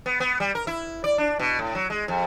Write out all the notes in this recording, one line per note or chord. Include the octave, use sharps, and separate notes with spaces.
B3
B3
G3
A#4
E4
D5
D4
B2
A2
F#3
G#3
F2